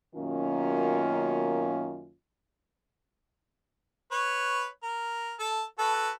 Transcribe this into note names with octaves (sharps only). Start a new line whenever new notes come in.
F#2 B2 D#3 A#3 C#4 F4
B4 C#5
A#4
A4 A5
F#4 A4 B4